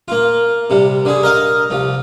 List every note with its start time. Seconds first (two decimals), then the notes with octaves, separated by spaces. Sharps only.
0.08 A#3 F4
0.70 C3 G3
1.05 D3 G#4
1.23 A#4 D#5 F5
1.70 C2 F3